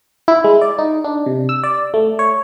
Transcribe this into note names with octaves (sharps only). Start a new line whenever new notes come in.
E4
G#3
D5
D#4
D4
C3
E6
D5
A3
C#5